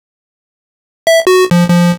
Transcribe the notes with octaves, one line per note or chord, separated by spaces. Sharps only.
E5
F#4
F3
F3